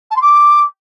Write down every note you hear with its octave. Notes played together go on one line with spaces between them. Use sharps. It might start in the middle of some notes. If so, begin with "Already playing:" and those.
A5
C6
D6